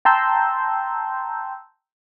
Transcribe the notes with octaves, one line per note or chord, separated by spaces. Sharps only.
G5 A5 A#5 C6 E6 G6